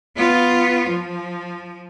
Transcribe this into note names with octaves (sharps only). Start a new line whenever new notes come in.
B3 F4
F3